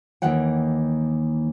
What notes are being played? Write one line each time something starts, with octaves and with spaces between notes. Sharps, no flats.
D#2 D#3 E3 A#3 F#5 G5